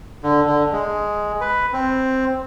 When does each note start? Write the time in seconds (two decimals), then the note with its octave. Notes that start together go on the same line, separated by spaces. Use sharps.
0.23 D3
0.46 D3
0.72 G#3
1.41 B4
1.73 C4